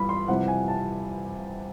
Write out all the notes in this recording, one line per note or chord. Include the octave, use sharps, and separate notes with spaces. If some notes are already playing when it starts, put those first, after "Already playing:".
Already playing: G2 E3 G3 B5
C6
F2 C3 E3 G3 F#5
G#5
A5